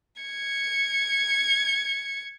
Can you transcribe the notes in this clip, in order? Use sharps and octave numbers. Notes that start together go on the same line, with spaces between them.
G#6 C#7